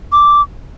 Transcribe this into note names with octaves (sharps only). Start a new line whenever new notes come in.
D6